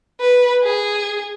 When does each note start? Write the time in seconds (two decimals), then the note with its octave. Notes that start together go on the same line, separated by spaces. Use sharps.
0.21 B4
0.63 G#4